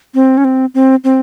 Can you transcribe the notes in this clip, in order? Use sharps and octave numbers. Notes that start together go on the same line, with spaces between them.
C4
C#4
C4
C4
C4